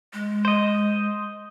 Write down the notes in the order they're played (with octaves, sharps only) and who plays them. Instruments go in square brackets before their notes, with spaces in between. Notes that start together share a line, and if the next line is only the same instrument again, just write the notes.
[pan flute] G#3
[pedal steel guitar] C5 D#5